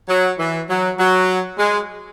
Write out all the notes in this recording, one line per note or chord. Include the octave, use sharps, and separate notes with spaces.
F#3
E3
F#3
F#3
G#3